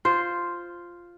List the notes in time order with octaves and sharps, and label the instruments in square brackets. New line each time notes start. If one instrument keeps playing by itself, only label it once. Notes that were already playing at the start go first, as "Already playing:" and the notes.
[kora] F4 C5